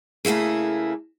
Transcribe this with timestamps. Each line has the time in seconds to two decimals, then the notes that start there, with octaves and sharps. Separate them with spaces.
0.25 C#3 A3 A#3 E4 G#4